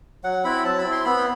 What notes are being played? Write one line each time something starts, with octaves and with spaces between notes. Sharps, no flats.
F#3 F#5
C4 E4 B5
F#3 A5
B5
C4 E4
C6
B3 B5